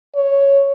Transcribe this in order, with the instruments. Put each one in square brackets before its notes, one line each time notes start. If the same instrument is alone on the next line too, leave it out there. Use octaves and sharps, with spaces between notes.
[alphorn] C#5